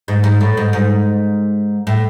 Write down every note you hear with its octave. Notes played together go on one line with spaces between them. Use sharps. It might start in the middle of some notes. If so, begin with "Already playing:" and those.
G#2
G#2
A2
G#2
G#2
A2